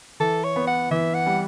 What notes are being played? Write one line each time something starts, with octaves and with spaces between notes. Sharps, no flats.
E3 A4
C#5
B3
F#5
E3 E5
F#5
G3